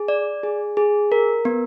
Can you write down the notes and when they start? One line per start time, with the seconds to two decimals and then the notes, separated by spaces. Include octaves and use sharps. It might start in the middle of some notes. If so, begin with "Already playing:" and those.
Already playing: G#4
0.08 D5
0.43 G#4
0.77 G#4
1.12 A#4
1.45 B3